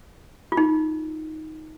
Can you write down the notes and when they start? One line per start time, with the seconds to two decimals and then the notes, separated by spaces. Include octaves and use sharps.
0.52 F4
0.57 D#4